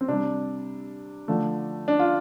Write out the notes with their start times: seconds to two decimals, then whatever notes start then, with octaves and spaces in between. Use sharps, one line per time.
0.01 C4
0.08 C3 G3 D4
1.28 D3 F3 A3
1.88 D4
1.99 F4